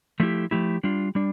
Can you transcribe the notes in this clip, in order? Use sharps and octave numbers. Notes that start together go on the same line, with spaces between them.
F3 A3 E4 G4
F3 A3 E4 G4
G3 D4 F4
G3 D4